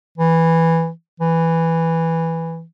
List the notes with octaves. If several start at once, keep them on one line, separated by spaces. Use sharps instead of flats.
E3
E3